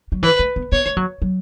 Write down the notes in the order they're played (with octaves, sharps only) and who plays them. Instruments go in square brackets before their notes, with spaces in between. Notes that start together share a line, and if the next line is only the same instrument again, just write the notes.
[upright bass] F#3
[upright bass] E3 [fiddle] B4
[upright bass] A3
B3
[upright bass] B3 [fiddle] C#5
[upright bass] A3
F#3
F#3